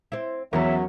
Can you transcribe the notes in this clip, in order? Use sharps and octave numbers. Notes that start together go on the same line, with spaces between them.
C4 E4
E2 F#3 C#4 E4 A#4 E5